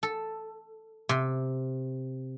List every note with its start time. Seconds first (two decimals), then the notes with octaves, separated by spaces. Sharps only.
0.03 A4
1.09 C3